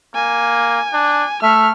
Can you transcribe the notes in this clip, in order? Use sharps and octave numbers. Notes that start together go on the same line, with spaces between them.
A#3 G#5
D4
A3 E5 F6